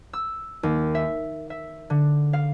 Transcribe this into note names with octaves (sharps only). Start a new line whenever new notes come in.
E6
D#2
E5
E5
D3
F5